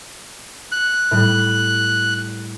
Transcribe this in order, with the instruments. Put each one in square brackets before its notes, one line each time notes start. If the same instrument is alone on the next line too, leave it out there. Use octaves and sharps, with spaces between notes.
[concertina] F#6 [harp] C#7
[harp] A2 G3